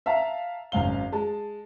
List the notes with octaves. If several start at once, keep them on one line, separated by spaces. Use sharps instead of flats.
E5 F5 A5 A#5
G#1 F#2 F5 G7
G#3 A5